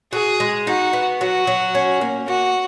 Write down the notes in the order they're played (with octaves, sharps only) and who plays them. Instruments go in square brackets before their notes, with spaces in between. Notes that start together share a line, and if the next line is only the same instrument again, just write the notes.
[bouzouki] F#4 [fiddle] G#4
[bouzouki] G#3
[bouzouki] D#4 [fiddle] F#4
[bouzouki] B3
[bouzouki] F#3 [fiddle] F#4
[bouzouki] F#3
C#4
A#3
[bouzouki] A#3 [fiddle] F#4